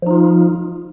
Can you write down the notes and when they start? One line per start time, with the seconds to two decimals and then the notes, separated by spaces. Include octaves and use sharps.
0.02 F3
0.07 D#4
0.11 F4